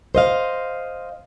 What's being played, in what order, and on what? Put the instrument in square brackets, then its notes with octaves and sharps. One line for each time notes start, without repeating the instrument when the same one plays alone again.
[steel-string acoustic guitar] C5 D#5 F5